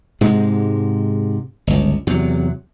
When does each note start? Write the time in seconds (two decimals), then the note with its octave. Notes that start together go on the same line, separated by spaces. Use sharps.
0.21 G#2 C3 G#3
1.67 G1 C#2
2.07 E2 C3 F#3